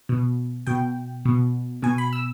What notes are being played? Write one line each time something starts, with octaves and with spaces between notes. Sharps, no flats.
B2
B2 G5
B2
B2 G#5
B5
E6